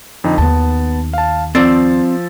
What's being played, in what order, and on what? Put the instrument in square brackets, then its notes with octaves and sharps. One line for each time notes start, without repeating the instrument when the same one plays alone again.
[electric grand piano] F2 D3 D#4
[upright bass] D#2 D#3 [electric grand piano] B3 A5
[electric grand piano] F5 A5
[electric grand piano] F3 E6 A6 [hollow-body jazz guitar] C4 D5